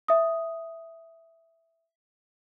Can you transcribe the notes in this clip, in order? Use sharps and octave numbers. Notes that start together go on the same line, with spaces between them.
E5 D#6